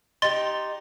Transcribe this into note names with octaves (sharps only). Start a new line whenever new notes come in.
D#4 G4 C6 A6